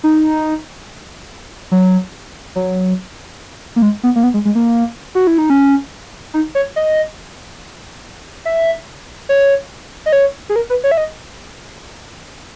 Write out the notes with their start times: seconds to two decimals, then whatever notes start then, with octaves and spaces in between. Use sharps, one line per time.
0.04 D#4
1.71 F#3
2.55 F#3
3.76 A#3
3.82 G#3
4.03 B3
4.16 A#3
4.23 B3
4.34 G#3
4.45 G#3
4.55 A#3
5.15 F#4
5.27 E4
5.38 D#4
5.50 C#4
6.34 D#4
6.55 C#5
6.76 D#5
8.45 E5
9.29 C#5
10.06 D#5
10.13 C#5
10.49 G#4
10.56 A#4
10.70 B4
10.84 C#5
10.92 E5
10.97 D#5